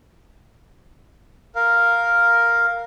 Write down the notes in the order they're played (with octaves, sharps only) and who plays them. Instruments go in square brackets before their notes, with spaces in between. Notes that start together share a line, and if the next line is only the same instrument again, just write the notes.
[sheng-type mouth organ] A#4 F5